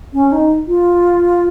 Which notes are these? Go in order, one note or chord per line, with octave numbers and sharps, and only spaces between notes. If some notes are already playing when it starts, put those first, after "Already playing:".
C#4
D#4
F4